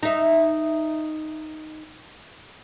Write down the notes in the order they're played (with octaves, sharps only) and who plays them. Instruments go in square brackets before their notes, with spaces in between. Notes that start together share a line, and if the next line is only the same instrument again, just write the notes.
[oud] D#4 E5